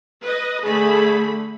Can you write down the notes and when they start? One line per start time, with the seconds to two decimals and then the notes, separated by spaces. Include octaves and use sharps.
0.23 B4 D#5
0.64 D3 A3 G#4 B5